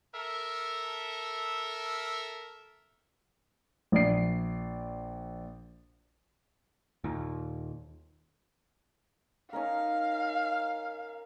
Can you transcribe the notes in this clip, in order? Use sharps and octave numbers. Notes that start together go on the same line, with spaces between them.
A4 A#4 E5
A#1 D5 C7
D#2 A#2
C#4 D#4 A#4 F5